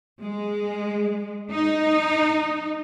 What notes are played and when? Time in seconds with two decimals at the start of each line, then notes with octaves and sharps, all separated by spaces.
0.22 G#3
1.52 D#4